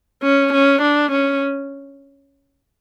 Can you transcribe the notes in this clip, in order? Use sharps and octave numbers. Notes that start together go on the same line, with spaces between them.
C#4
C#4
D4
C#4